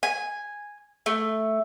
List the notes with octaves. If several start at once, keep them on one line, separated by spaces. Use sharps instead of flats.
G#5
A3